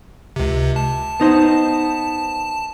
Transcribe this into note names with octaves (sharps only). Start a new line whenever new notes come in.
C#2 C3
A5
B3 D#4 C5